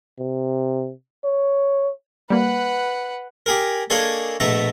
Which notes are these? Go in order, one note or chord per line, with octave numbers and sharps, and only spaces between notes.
C3
C#5
G3 A#3 B4 F#5
G4 G#4 A#4
A#3 D4 G#4 A4 C#5 D#5
A#1 B2 A3 A4 E5 A#5